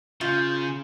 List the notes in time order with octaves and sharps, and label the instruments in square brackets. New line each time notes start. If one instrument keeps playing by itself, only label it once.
[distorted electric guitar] C#3 [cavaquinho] F4 [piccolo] G6